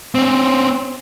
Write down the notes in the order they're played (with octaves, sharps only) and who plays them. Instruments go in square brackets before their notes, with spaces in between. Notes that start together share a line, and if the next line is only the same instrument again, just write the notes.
[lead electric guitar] C4 C#4